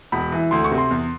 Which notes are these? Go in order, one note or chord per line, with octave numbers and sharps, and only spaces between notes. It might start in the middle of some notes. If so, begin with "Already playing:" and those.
E1 B5
E3
D2 C6
C#6
C3
C6
E2